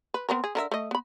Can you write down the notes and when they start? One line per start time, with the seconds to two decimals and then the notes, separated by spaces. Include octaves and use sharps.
0.14 B4
0.29 B3 C4 A#4
0.44 G#4
0.55 D3 A#4 E5
0.71 A3 D#5
0.91 B3 B5